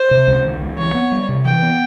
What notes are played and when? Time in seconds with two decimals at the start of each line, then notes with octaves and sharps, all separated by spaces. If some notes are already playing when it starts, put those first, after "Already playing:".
Already playing: C5
0.11 C3
0.27 C#2
0.45 D#3
0.62 C#2
0.78 E3 C#5
0.95 B3
1.12 G3
1.29 C3
1.45 E3 G5
1.62 B3